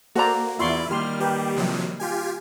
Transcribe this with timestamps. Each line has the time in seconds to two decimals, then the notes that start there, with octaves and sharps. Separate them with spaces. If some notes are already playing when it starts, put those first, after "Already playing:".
0.15 A#3 F#4 A4 C5 D5 A#5
0.59 E2 E4 F4 D5 C6 C#6
0.91 D#3 G3 A#3 G4 C6 F6
1.20 G4 A#4 B4 G5
1.56 C3 F3 F#3
2.00 F4 G4 G#5